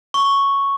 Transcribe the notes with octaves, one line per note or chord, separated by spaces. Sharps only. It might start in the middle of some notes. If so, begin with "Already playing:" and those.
C#6